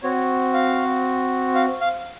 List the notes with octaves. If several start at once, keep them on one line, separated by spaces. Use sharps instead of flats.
C4 F#4 C#5
F5
F5
F5